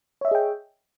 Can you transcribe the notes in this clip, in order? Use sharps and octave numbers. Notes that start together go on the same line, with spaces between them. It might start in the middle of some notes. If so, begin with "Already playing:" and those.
G#4 C#5 D#5 E5 G5